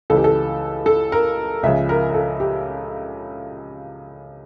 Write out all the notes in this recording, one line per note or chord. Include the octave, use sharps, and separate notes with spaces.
C#2 C#3 E3 A4
G4
A4
A4
A#4
C#2 C#3 F3 E5
A#4
A#4
A4
G4